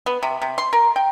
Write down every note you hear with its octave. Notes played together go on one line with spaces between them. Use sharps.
B3
C3
C3
C6
A#4
G5